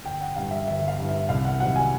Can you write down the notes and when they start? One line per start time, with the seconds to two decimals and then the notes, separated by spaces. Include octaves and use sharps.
0.05 G1 G5
0.21 F#5
0.36 G2 E3 F5
0.51 E5
0.68 G1 E5
0.88 F5
0.99 G2 E3
1.09 E5
1.29 C2 F5
1.45 F#5
1.60 C3 D#3 F#3 F#5
1.76 G#5